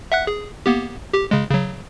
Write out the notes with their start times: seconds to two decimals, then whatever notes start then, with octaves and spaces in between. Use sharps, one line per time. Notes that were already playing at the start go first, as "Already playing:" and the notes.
0.12 E5 F#5 F#6
0.27 G#4
0.66 A#3 B3 G4
1.14 G4
1.31 C#3 G#3
1.50 C#3 F#3